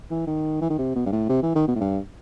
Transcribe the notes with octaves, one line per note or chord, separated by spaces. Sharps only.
E3
D#3
E3
D#3
C3
B2
G2
A2
C3
E3
D#3
B2
A2
G2